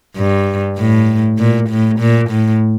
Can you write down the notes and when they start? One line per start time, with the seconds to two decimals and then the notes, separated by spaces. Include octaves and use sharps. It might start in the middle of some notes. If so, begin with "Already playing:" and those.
0.16 G2
0.77 A2
1.38 A#2
1.69 A2
2.00 A#2
2.30 A2